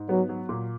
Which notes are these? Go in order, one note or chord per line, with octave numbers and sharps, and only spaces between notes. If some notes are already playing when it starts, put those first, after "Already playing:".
Already playing: G#2
F#3 B3
F#3
A#2